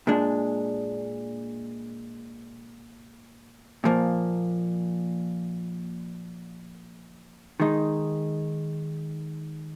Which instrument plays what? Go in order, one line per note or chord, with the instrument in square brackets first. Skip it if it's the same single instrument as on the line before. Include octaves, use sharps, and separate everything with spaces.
[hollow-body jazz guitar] A#2 G#3 D4
A#2 F3 A#3
D#3 G#3 D#4